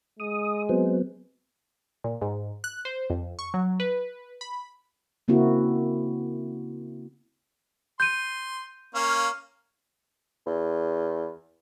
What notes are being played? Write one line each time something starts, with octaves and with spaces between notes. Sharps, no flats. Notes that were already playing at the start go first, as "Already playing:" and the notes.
G#3 D#6
F#3 B3 C4
A#2
G#2
F#6
C5
F2
C#6
F#3
B4
B5
C#3 A#3 C4 E4 F#4
C6 G6 D#7
A#3 C#4 F5
E2